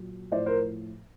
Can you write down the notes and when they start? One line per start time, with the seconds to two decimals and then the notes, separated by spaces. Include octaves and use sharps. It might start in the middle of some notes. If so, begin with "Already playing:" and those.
Already playing: A#2 F#3
0.31 A2 F3 C5 D5
0.46 A#4 C5